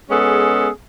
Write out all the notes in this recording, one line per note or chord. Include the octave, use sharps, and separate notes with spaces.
G#3 B3 C#4 G#4 A4